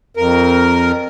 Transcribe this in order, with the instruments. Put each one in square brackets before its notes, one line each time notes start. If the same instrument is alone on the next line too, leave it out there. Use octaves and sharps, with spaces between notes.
[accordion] F2 A#4